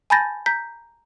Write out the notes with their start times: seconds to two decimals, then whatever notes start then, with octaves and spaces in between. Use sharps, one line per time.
0.10 G#5 A5 B5 G6 A6 A#6
0.46 A#5 G6 B6